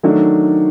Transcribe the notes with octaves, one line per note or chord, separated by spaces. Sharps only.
D#3 F#3 A3 D4